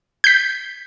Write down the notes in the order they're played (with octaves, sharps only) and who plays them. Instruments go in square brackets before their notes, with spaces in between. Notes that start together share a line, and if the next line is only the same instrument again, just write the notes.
[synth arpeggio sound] G6 B6